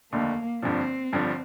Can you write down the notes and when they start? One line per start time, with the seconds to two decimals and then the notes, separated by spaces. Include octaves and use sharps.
0.12 F1 D#2 D3 A3 A#3
0.62 G1 G2 D3 F3 C4
1.13 G1 G2 D3 F3